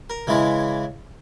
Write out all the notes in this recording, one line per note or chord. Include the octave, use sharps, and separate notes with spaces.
A#4
C#3 E3 G#3 E4